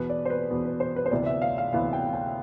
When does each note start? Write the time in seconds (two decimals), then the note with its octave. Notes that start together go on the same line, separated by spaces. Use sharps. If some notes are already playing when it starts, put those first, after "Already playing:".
Already playing: E2 B2 B3 B4
0.10 D5
0.25 C5
0.30 B4
0.50 E2 B2 B3
0.65 B4
0.80 C5
0.96 B4
1.06 C5
1.11 D2 C3 E3 B3 D5
1.26 E5
1.42 F5
1.58 F5
1.73 D2 C3 E3 B3 F5
1.93 G5
2.13 G5